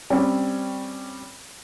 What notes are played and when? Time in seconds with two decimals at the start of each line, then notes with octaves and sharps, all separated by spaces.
0.10 G3 C4 C#4